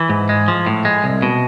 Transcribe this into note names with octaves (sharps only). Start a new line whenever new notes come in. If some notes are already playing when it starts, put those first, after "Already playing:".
Already playing: E3
G#2
G#3
F3
A2
G#3
C2
B2